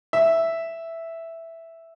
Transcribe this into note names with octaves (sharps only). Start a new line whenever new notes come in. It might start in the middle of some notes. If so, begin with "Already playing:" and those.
E5